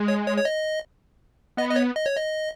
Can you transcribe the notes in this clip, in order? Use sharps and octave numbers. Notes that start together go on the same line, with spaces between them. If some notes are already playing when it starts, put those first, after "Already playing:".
Already playing: G#3
C#5
C#5
C#5
D#5
B3 D#5
D#5
C#5
D#5
C#5
D#5